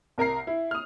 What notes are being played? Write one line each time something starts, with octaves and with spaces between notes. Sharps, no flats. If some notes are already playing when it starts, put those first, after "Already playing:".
C2 A#4 A#5 C7
E4
D#6 F6